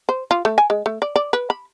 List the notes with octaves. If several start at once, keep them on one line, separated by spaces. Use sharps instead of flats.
C5
F4
A3
G#5
G#3
A3
D5
D5
B4
B5